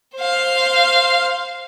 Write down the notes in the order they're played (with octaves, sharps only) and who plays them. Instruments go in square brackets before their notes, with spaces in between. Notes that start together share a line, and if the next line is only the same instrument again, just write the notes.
[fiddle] C5 F5